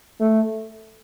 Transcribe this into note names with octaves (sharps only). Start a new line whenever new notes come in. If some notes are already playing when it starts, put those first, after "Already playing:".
A3